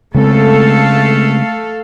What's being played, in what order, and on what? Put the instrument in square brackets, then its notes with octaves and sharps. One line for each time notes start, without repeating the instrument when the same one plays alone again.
[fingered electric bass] C#3 G#3 C4 [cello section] A3 A4 F5